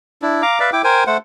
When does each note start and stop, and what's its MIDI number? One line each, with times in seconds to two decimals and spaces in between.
0.22 0.42 62
0.22 0.42 64
0.42 0.59 77
0.42 0.59 82
0.42 0.59 86
0.60 0.70 71
0.60 0.70 74
0.60 0.70 76
0.60 0.70 77
0.73 0.82 64
0.73 0.82 79
0.73 0.82 86
0.84 1.04 70
0.84 1.04 72
0.84 1.04 79
0.84 1.04 80
1.07 1.17 57
1.07 1.17 72
1.07 1.17 78